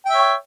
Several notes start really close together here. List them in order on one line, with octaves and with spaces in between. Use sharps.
G5 E5 C#5